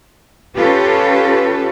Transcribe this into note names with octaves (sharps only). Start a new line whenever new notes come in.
C#4 F4 G4 A4 B4